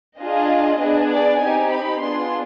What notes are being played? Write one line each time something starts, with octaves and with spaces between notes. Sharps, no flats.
D4 F4 G#4 D#5
B3 D4 G#4
D5
C4 D#4 G4 G#5
B5
B3 D4 F4 G#4 C6